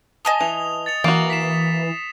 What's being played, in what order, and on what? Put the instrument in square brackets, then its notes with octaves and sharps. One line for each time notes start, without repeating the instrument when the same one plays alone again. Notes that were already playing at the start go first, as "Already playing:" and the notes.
[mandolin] D#5 G#5 A5 [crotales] D#6 G7
[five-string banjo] E3 [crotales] F7
[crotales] A6 C#7 F7
[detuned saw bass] E3 [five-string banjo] A#3 F#4
[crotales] B6 C7 E7